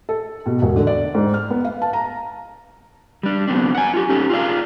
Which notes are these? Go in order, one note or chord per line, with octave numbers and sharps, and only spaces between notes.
A4
B2
E1
D3
D5
G#2
F6
B3
F5
A5
A#5
G3 D4
F#3 B3 C4 D4
F#5 G#5
F4 G4
C#4 D#4 G4 A4
F4 G#4 D5 F5